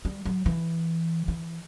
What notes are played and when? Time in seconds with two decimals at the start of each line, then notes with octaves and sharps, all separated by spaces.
0.05 G3
0.25 F#3
0.46 E3
1.28 E3